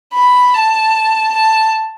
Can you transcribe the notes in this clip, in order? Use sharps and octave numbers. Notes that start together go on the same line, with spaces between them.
B5
A5
A5